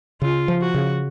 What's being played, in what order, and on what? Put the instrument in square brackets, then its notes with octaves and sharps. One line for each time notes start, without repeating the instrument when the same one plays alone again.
[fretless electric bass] C#3 [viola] F4
[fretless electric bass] F3
[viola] F#4
[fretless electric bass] C#3